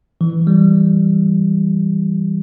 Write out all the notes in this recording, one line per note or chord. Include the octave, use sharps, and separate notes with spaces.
E3
G3